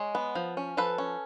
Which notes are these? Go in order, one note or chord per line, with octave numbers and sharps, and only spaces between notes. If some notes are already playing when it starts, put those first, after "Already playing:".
Already playing: G#3 C#5
B3
F3
C#4
F3 A4 B4
C#4